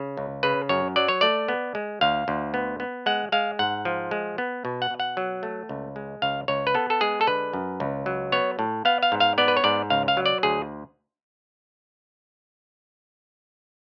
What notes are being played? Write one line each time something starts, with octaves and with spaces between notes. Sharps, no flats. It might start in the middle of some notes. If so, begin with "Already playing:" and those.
Already playing: C#3
C#2
C#3 B4
F#2 C#5
F#3 D5
C#5
A3 D5
B3
G#3
D2 F5
D2
B3
B3
G#3 F#5
G#3 F5
G#2 F#5
F3
G#3
B3
B2
F#5
B2
F#5
F#3
A3
C#2
G#3
C#2 F5
C#2 C#5
B4
B3 A4
A4
G#3 G#4
A4
D3 B4
F#2
C#2
F#3
B3 C#5
A2
B3 F5
F5
G#2
F5
B3 D5
B4
C#5
G#2 D5
C#2 F5
F5
F#3
D5
D2 G#4